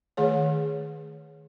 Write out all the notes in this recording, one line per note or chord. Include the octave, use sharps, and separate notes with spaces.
D#3 A3 G#4 C#5